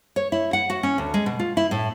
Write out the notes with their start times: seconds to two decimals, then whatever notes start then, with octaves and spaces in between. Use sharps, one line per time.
0.16 C#5
0.32 E4
0.53 F#5
0.70 F#4
0.83 C#4
0.98 D2
1.14 G#3
1.26 B2
1.39 F4
1.57 E4
1.71 A2